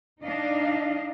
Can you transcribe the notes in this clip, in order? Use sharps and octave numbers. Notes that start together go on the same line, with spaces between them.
D4 D#4 D#5 F5